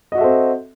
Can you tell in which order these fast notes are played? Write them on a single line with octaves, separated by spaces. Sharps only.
D#5 F#4 E5 A4 C4